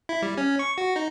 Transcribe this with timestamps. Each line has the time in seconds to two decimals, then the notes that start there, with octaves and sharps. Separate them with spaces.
0.09 E4
0.22 G3
0.37 C#4
0.59 C#6
0.78 F#4
0.96 D#4